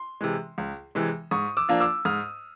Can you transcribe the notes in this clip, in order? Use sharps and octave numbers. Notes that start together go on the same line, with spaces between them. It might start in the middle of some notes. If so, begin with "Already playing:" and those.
Already playing: C6
C3 E3 G#3
C#2
C3 E3 G#3
G#2 C#6 D#6
D6 E6
F3 A#3 D4 F4
D6 E6
G#2 D#6 F6